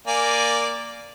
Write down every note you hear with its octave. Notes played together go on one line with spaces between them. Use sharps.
A#3 D5 G#5